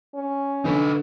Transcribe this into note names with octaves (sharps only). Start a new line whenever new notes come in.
C#4
D3 D#4 B4